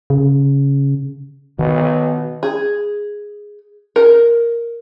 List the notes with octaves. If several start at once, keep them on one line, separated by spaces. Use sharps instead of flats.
C#3
B2 D#3
G#4
A#4